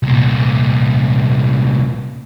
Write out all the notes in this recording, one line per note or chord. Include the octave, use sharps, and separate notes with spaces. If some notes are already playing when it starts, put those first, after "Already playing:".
C2 A#2